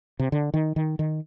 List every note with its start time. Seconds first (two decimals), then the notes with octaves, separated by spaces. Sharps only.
0.19 C3
0.32 D3
0.54 D#3
0.76 D#3
0.99 D#3